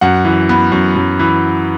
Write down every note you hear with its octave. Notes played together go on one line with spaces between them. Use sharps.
F#2 F#5
E3
B3
F#2
F#2
E3